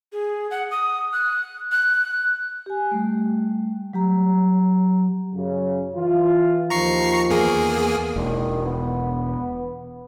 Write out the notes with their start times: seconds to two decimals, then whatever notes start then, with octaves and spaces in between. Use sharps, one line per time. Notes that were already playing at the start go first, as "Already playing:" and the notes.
0.13 G#4
0.51 F#5
0.71 D#6
1.13 F#6
1.72 F#6
2.66 G4 G#5
2.91 G3 A3
3.93 F#3 G4 A#5
5.34 F#2 C#3
5.96 E3 F4
6.70 D#2 D#3 F3 A#5 C#6 C7
7.30 E2 A#3 G#4
8.16 E1 D#3
8.65 B3